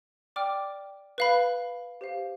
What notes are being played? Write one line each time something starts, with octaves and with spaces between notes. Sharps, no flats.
D5 G5 D6 F6
B4 F5 B5
G4 C5 F5